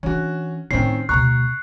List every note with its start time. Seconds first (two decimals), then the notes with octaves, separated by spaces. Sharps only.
0.03 E3 C#4 D4 F#4
0.71 A2 D#3 C4 C#4 D#4 C7
1.09 D2 B2 A#5 C#6 F#6